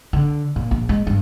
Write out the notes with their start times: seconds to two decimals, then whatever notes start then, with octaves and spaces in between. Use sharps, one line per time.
0.13 D3
0.56 A#2
0.71 A#1
0.89 G#3
1.07 G2